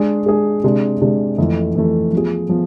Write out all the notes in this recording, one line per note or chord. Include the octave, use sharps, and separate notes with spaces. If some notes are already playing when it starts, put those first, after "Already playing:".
Already playing: G#3 D4 G#4
G#3 D4 G#4
C3 G#3 D4
C3 G#3 D4
F2 E3 A3
F2 E3 A3
F3 B3 F4 G#4
F3 B3